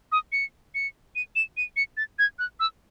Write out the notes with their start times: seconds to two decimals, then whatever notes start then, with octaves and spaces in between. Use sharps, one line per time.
0.12 D#6
0.32 C#7
0.75 C#7
1.16 D#7
1.36 E7
1.57 D#7
1.77 C#7
1.97 A6
2.19 G#6
2.39 F#6
2.60 E6